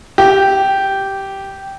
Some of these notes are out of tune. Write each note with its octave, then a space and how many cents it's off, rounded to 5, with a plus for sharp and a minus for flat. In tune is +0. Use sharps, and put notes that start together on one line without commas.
G4 -10